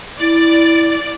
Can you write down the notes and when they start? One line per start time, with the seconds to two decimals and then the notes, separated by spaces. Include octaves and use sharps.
0.20 E4 D5